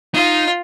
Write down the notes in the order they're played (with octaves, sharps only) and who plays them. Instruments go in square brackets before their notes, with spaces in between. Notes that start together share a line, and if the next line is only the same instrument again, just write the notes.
[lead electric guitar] D#4 [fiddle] F4